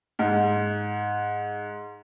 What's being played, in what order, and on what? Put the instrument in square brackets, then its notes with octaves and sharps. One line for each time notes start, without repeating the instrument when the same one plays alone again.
[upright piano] G#2